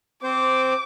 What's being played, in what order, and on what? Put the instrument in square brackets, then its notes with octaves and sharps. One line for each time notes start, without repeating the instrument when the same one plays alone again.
[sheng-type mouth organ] C4 C5 [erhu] D6